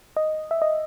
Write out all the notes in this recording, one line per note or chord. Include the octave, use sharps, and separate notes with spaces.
D#5
E5
D#5